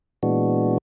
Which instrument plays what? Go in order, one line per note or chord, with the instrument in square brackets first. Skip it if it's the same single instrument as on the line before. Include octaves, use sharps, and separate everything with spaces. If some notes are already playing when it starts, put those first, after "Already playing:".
[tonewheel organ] A#2 E3 G#3 B3 D4 F#4